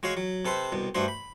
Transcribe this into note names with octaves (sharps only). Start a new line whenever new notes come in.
G#3 F#4 C#5 F5
F#3
C3 A4 B4 C5
C2 B2
G2 A3 F#4 C5
B5